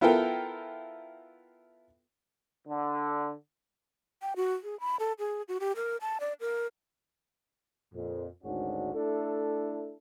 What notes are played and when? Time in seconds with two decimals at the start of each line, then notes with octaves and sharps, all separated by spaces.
0.01 B3 E4 F4 A4 A#4 G5
2.68 D3
4.22 G5
4.36 F#4
4.63 G#4
4.80 B5
5.00 A4
5.19 G#4
5.48 F#4
5.60 G4
5.76 A#4
6.01 A5
6.20 D5
6.40 A#4
7.94 F2 A#2
8.44 G#1 D2 G#2 C#4 D4 F#4
8.94 A3 D4 E4 A4